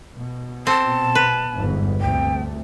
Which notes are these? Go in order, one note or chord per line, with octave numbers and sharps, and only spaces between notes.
B2
C4 A5
B4
G1 E2 G#2
D2 C3 A3 G5